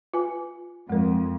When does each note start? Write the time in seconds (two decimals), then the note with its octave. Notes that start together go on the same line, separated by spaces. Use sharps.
0.14 F4 B4 G#5
0.90 F2 G#3 A#4